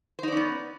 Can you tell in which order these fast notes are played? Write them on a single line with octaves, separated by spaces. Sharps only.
C5 D#4 D5 C#4 B3